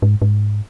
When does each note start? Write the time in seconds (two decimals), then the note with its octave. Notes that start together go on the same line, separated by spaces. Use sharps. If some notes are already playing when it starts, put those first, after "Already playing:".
0.02 G#2
0.22 G#2